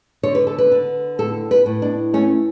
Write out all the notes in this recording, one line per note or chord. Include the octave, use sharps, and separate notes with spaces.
D3 C#5
B4
A4
B4
D3
A2 A4
B4
A2
D4
A3 C#4